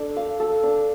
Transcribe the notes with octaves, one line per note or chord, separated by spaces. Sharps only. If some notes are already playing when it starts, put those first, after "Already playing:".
Already playing: D4 A4
F5
A4
D4